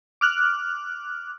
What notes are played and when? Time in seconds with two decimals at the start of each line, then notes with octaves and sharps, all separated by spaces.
0.21 D6 F6 F#6